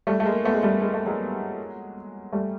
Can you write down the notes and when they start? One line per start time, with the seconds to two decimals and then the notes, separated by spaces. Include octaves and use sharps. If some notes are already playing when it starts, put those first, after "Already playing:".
0.07 G3 A3
0.20 A3
0.25 G#3 A#3
0.44 A3 B3
0.55 G#3
0.63 G3 A3
0.82 G#3
0.94 A3
1.06 F#3 G#3
2.33 G3 A3